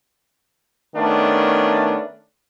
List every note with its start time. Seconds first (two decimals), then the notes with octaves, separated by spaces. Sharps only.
0.95 D#3 A3 B3 C#4 D4